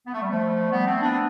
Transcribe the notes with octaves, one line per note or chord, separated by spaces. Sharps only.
B3
A3
G3
F3 A3
G3 B3
A3 C4
B3 D4
D4